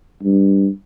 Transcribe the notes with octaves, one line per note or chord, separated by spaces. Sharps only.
G2